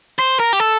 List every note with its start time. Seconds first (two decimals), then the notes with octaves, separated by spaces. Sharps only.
0.19 C5
0.40 A#4
0.53 G4
0.60 A4